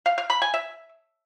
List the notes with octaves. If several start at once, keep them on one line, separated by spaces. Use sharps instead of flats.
F5
F5
B5
G#5
E5